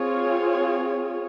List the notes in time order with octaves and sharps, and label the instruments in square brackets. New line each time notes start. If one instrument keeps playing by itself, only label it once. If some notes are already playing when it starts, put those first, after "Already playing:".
Already playing: [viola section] C4 F4 G#4 C#5